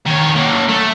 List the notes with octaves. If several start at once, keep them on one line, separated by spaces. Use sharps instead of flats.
D#3 C#5
F#3 A#3
A3